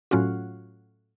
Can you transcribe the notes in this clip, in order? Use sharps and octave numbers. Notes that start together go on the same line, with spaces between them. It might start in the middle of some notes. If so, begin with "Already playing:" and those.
A2 F#3 C#4 F4 F#4